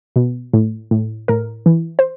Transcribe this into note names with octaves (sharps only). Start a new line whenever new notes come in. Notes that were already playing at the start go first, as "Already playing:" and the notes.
B2
A2
A2
A2 A#4
E3
C5